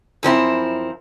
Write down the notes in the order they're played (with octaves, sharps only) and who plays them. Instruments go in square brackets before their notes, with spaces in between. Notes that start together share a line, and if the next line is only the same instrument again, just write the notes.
[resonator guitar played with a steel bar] F#2 F3 C4 E4